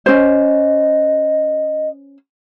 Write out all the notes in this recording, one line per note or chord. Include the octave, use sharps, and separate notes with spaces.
C#4 C5 D#5